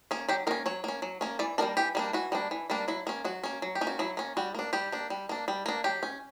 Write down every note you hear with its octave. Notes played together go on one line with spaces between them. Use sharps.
A#3 C#4
F#3 G4
A#3 C#4 A#4
F#3 C#5
A#3 C#4
F#3
A#3 C#4
E3 D5
G3 A#3 D4 A#4
E3 G4
G3 A#3 D4
E3 F#4
G3 A#3 D4
E3
G3 A#3 D4
F#3 E4
A#3 C#4
F#3 F#4
A#3 C#4
F#3
G4
A#3 C#4
F#4
F#3 E4
A#3 C#4
G3 F#4
A#3 D4
G3 G4
A#3 D4
G3
A#3 D4
G3
A#3 D4
F#3 G4
C#4